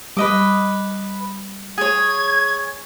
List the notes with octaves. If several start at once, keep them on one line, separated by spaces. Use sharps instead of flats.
G3 B4 D#5 D6
G#4 C#5 G#6